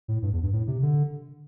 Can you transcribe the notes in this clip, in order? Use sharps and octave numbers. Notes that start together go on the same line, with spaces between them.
A2
G2
E2
G2
A2
C3
D3